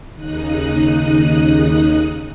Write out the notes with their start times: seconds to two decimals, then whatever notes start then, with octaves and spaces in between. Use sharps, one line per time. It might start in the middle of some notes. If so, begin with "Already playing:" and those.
0.15 D#2 C#3 D#4 D#6 F#6